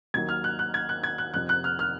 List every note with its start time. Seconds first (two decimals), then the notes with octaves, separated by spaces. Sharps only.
0.14 D#2 D#3 F#3 G#6
0.29 F6
0.44 F#6
0.59 F#6
0.74 G#6
0.89 F#6
1.04 G#6
1.18 F#6
1.34 F2 C3 F3 F#6
1.49 F#6
1.64 F6
1.79 F6